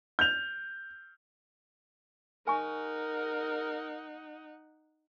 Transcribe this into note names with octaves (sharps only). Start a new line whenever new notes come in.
G6 F7
D#4 A#4 F#5 G#5 C#6